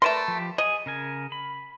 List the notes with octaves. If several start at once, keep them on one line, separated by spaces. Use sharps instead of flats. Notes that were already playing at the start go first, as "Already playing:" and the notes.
A3 A#4 B4 D5 A5 C6
F3 G4
G#4 D#5 G#5
C#3 A#4 G#5
B5